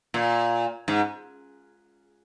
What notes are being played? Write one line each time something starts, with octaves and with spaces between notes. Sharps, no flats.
A#2
G#2